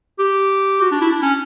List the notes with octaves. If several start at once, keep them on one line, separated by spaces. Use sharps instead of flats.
G4
F#4
D4
E4
D4
C#4